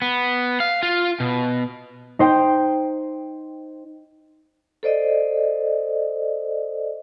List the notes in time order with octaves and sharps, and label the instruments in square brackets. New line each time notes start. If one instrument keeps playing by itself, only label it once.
[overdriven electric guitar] B3
F5
F4
B2
[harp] D#4 C5 G5
[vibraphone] A4 C5 D5 D#5